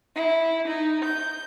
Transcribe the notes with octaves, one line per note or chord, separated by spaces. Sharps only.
E4
D#4
G6